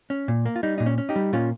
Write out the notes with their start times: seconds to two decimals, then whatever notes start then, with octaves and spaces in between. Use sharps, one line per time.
0.10 C#4
0.28 A#2
0.45 A#3
0.56 F4
0.63 G3 D#4
0.78 A#2 D#4
0.86 C#4
0.98 C#4
1.09 D#4 G4
1.16 G3
1.33 A#2 C#4 F4